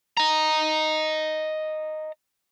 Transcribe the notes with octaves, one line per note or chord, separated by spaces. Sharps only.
D#5 A#5